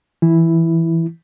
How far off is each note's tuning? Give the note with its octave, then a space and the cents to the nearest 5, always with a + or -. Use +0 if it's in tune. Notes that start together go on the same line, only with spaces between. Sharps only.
E3 +0 E4 +0